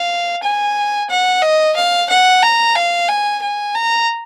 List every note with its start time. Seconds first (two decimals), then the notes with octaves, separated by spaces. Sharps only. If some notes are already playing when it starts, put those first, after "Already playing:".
Already playing: F5
0.43 G#5
1.09 F#5
1.42 D#5
1.76 F5
2.10 F#5
2.43 A#5
2.76 F5
3.08 G#5
3.42 G#5
3.75 A#5